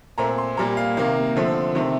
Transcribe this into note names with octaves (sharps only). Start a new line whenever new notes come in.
A#2 A3 C4 A#5
C6
A#2 G3 A#3 A#5
F5
C3 D#3 A#3 F5
D3 F3 A3 C4
C3 D#3 A3 C4